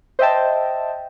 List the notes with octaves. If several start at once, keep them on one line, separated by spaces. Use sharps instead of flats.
C5 D#5 E5 G5 A5